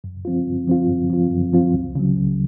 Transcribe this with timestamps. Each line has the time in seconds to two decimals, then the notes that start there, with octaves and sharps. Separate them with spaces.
0.04 F#2
0.25 F3 C4 F4
0.47 F#2
0.67 F3 C4 F4
0.88 F#2
1.10 F3 C4 F4
1.31 F#2
1.53 F3 C4 F4
1.74 C#2
1.95 C#3 F#3
2.17 C#2